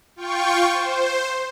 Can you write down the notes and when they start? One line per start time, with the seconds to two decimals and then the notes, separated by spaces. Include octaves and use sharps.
0.16 F4 G5 C#6
0.73 C5